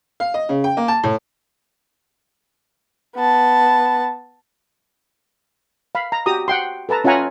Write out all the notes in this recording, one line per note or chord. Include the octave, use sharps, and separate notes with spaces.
F5
D#5
C#3
G5
A#3
A5
A2
B3 A5
F5 B5
A#5
F#4 G4 A#5 D#6
F#5 G5 C6
A4 B4 A5 A#5
C#4 F4 E5 F#5 G#5 A#5